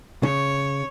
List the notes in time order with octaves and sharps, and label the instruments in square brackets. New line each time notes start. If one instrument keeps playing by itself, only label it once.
[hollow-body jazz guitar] C#3 [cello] C#5